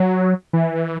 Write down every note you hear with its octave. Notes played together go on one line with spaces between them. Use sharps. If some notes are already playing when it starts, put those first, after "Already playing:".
Already playing: F#3
E3